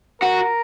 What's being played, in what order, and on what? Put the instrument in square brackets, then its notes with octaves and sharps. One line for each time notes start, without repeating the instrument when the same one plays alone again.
[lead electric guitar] F#4 [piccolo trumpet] A#4